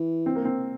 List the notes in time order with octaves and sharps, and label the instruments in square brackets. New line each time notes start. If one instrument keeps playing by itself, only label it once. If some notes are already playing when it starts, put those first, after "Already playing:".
Already playing: [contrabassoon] E3
[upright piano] C4
A#3
C4